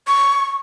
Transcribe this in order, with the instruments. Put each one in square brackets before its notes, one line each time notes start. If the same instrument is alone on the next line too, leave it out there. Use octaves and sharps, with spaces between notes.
[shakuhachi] C#6